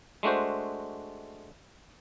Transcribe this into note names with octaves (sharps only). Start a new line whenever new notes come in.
G#3 A3 D4 F#4 C5